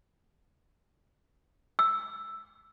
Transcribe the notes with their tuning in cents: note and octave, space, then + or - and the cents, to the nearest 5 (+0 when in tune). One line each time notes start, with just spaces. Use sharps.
E6 +5